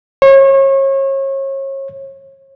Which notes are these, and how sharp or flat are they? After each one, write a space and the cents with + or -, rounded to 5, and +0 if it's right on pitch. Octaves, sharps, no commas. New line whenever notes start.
C#5 -35